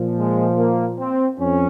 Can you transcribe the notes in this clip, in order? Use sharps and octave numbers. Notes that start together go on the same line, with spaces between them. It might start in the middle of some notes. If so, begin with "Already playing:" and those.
Already playing: A#2 F3
G#3
A#3
C4
F2 C#4